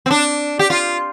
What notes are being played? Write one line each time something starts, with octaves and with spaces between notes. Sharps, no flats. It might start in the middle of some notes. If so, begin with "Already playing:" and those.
C4
D4
G4
F4